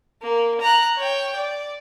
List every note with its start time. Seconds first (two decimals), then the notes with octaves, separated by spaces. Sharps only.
0.22 A#3
0.61 A#5 F#6
0.97 C#5 G5
1.36 D5